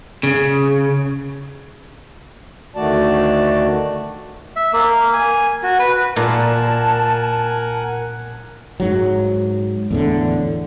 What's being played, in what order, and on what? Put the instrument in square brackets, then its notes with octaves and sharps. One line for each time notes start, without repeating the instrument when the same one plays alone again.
[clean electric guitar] C#3
[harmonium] D2 D#3 A3 F#4 D5 A5
[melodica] E5
A#3
G#5
F#4
B4
[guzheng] A#2 [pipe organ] A#4 F#5 G#5 [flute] A5
[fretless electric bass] G#2 F#3
E2 A2 D3